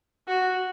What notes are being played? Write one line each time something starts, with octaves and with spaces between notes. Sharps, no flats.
F#4